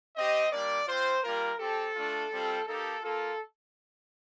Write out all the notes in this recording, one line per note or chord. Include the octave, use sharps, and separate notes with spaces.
C4 G4 D#5
G3 A#3 D4 D5
C4 F4 C5
G3 A#3 F4 A#4
C4 G4 A4
A3 D4 F4
G3 C4 F4
A#3 D#4 G4 A4
A#3 F4 A4